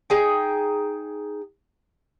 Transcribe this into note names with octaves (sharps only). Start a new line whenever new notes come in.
D#4 G#4 G5